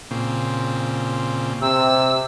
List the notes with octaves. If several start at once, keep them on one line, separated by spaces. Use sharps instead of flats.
A#2 C#3 C4
C3 E6